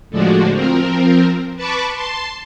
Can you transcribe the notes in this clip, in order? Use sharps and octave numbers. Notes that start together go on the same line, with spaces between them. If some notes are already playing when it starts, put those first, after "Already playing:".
A2 D3 F3 G#3 D4 F#4
F3 C4 A#4
B4 A5 B5 C#6 D6
A5 C6